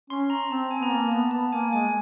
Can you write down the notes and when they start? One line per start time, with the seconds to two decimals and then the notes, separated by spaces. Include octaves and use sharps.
0.10 C#4 C6
0.30 A#5
0.51 C4 A5
0.71 G#5
0.80 B3 A#5
0.91 A#3 A5
1.11 B3 A5
1.31 B3 A5
1.52 A#3 G#5
1.73 G#3 G#5